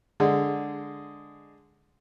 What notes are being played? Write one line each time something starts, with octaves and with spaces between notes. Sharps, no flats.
D3 G#3